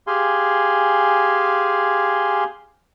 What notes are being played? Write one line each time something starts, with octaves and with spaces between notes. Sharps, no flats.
G4 G#4 F5 G#5 C6